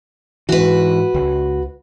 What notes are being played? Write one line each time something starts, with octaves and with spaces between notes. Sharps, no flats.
G#2 E3 F#4 B4
C#2